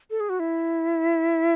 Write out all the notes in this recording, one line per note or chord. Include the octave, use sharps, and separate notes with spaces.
A4
G#4
F#4
E4